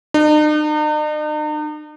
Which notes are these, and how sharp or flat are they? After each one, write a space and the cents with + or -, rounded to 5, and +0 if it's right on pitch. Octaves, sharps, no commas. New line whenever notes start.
D#4 -45